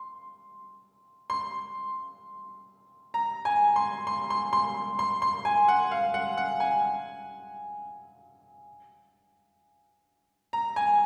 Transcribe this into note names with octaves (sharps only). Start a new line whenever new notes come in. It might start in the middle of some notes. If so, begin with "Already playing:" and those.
Already playing: C6
C6
A#5
G#5
C6
C6
C6
C6
C6
C6
G#5
F#5
F5
F#5
F#5
G#5
A#5
G#5